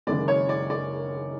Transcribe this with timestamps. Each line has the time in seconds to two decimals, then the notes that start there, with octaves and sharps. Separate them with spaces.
0.07 F#1 F#2 D#3 G#3 D5
0.28 C#5
0.49 D5
0.70 D5